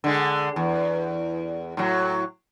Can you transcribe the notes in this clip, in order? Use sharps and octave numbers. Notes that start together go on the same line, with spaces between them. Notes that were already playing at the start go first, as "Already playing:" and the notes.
D3 G#3
E2
A2 F#3